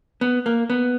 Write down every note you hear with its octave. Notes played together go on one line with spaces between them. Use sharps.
B3
A#3
B3